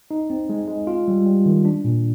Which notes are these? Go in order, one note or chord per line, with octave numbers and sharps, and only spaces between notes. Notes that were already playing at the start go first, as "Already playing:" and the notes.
D#4
C4
G#3
G#3
F4
G3
G3
D#3
D4
A#2